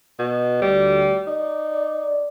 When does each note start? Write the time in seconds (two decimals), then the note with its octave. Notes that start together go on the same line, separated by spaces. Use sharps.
0.19 B2
0.62 D2 G3
1.27 D#4 D5